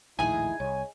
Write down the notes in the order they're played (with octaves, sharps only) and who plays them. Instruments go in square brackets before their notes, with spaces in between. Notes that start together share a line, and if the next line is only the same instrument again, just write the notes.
[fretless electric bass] A#1 D#2 A2 [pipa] D#4 G#4 [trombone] E4 [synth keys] G#5
[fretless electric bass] C2 [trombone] C#5